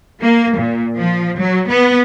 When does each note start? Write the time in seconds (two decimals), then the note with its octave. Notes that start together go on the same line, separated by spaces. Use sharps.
0.21 A#3
0.57 A#2
0.98 F3
1.40 F#3
1.68 B3